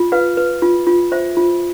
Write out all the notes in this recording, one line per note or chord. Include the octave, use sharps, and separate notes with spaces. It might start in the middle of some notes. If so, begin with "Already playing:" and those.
Already playing: F4
B4 F5
B4
F4
F4
C5 E5
F4